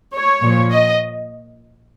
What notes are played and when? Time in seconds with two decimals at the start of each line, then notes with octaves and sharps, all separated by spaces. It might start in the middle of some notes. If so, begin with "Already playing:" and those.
0.14 C#5
0.43 A#2 F3
0.72 D#5